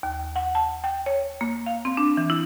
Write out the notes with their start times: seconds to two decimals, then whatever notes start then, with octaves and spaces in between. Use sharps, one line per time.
0.03 D#2
0.36 F#5
0.55 A5
0.84 G5
1.06 C#5
1.41 A#3
1.66 F5
1.85 C4
1.97 D4
2.17 E3
2.30 E4